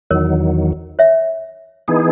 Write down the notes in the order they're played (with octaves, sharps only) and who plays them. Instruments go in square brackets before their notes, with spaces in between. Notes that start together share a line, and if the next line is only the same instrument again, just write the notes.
[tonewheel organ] E2 D#3 F#3 [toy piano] A#4 C#5
[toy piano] C#5 E5
[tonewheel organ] E3 B3 D#4 G#4